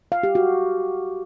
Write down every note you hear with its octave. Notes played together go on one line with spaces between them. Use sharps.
F5
G4
F#4